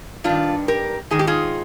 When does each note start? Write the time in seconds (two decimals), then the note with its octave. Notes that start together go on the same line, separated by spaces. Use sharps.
0.24 G2 D#3 D4 F4
0.68 G4 A#4
1.11 G#2 D#3 G#4
1.19 G4
1.27 F4 G#4